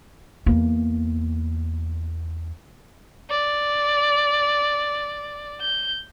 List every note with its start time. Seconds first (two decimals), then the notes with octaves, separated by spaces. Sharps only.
0.46 E2 A#3
3.30 D5
5.61 G6